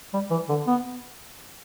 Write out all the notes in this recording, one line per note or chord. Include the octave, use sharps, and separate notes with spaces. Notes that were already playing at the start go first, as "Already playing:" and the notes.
G3
E3
D3
B3